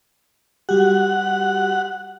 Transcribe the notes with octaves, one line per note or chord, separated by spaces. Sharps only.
G3 F#4 G4 F#5